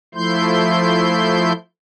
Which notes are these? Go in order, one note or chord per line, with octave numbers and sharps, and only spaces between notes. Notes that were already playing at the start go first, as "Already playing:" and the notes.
F3 A3 E4 C6 G6